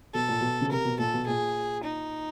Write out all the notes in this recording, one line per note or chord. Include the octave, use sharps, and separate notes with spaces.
B2 A4
A#2
B2
C#3
C3 A#4
B2
A#2 A4
B2
A#2 G#4
D#4